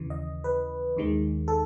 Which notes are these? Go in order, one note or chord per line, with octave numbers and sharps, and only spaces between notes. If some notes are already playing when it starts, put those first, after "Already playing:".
Already playing: D#2 C#3 E3
D#5
B4
D#2 D#3 G#3
A4